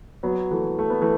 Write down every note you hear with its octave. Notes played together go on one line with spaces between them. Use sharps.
F#3 B3
E3 A3
A3
B3
E3 A3